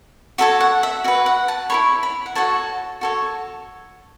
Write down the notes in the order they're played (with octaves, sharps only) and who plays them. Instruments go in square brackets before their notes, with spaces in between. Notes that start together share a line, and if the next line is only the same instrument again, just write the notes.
[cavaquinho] F#4 A4 C#5 E5
F#5
E5
F#4 E5
B4
F#5
A5
E4 A4 C#5 B5
B5
F#5
F#4 A4 C#5 A5
F#4 A4 C#5